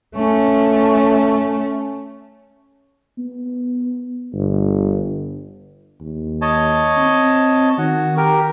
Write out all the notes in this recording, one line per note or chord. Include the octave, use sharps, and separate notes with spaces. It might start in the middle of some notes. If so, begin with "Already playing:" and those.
A3 C#4
B3
G1
D#2
C#5 D#5 A5
C4
D#3 F#4
G4 A#4